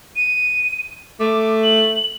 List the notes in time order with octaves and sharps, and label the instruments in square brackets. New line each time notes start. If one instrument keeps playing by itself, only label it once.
[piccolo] D#7
[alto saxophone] A3 [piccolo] D6
[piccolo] F#7